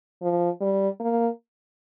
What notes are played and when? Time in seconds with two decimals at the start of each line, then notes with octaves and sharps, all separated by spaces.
0.22 F3
0.61 G3
1.00 A#3